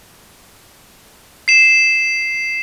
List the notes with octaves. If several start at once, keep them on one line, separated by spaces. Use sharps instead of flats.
C7 E7